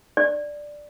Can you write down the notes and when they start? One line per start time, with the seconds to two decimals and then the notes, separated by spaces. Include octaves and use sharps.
0.17 D5